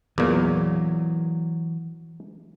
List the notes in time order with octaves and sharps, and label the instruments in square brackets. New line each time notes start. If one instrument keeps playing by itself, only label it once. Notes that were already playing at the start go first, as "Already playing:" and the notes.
[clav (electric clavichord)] E2 A#2 [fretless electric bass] E3 F#3